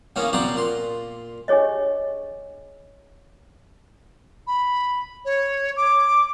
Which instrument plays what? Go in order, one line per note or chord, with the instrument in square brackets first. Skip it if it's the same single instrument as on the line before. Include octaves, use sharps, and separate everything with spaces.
[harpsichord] C#3 E3 A#3 B3 C#4
B2 G4 D5 F#5 A#5 C6
A#2 C6
[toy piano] D4 G4 G#4 C#5 D#5
[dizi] B5
C#5
D6